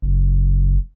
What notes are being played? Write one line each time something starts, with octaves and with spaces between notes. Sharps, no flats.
F#1